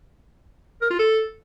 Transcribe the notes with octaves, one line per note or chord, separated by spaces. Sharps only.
A#4
F4
A4